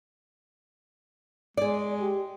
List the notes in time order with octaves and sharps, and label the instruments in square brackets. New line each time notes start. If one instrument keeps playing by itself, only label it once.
[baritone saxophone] G#3 [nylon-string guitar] G#4 D5
[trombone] G4